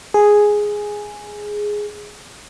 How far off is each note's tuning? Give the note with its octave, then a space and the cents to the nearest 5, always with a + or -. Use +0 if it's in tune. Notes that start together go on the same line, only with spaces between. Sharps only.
G#4 +0